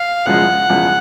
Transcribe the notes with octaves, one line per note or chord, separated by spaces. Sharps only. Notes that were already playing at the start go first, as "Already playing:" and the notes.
Already playing: F5
E1 E2 C#3 F3 G#3 F#5
E1 E2 C#3 F3 G#3